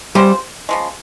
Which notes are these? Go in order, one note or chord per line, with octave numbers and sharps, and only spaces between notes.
G3 G#3 C4 F4 C5
C#3 F3 G#3